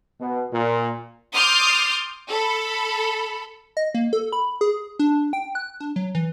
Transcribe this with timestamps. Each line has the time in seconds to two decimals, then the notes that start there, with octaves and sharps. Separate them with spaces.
0.20 B2
0.53 A#2
1.33 C6 D6 D#6 F6 G6 A6
2.28 A4 B5
3.77 D#5
3.94 A#3
4.13 A4
4.33 B5
4.61 G#4
4.99 D4
5.33 G5
5.55 F#6
5.80 D4
5.96 F#3
6.15 E3